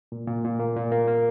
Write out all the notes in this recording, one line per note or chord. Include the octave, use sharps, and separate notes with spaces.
A#2
A#2
A#2
A#3
A#2
A#3
A#3